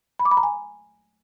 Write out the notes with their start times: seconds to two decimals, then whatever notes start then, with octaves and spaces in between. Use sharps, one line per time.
0.19 B5
0.25 D6
0.31 B5
0.37 A#5
0.43 G#5